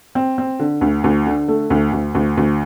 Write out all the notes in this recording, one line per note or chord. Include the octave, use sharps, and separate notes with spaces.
C4
C4
D3
D2
D2
D3
A3
D2
D2
D2
D2